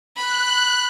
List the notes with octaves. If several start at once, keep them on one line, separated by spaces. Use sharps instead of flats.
B5 F#6